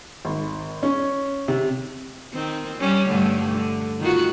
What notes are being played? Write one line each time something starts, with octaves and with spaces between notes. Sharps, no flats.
G#1
C#4
C3
D#3 C4
G3 C#4
G2 D3 A3
D3
D#3 F4 F#4